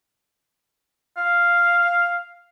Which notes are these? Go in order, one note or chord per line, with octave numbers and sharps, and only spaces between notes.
F5